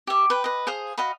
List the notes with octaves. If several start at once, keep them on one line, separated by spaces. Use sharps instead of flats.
G4 E5
B4 G5
B4 D#5
G#4 C5 F5 D#6
F#4 D#5 F5 B5